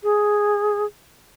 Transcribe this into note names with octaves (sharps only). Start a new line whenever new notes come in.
G#4